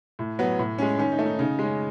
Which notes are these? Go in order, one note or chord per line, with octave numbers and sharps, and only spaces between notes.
A2
F#3 B3
A2
G#3 C#4
D#3 C#4
D#4
A3 C#4
D#4
C#3 D#4
G#3 C#4